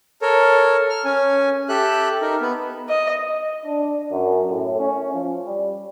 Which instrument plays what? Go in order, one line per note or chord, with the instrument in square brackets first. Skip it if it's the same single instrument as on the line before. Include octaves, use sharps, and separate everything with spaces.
[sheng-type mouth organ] A4 A#4 C#5
F6
C#4 G#5
G4 A4 E5 F#6
D#4 A#4
B3
[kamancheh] D#5
[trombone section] D4
F#2
A2
C#4
F3
G3